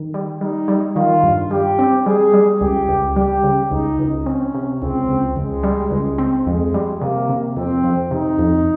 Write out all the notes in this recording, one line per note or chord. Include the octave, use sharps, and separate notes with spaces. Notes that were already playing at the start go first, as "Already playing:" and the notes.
Already playing: D#3
G3
G3 D#4
G3
D#3 F4
G2
G3 G4
C4
G3 G#4
G3
C#2 G4
C#2
G3 G4
C#3
C#2 D#4
C#2
C4 C#4
C3
C#2 C4
C#2
C#2 G#3
G3
C#2
C4
F2 G#3
G3
C3 A#3
C3
F2 C4
F2
C3 D#4
F2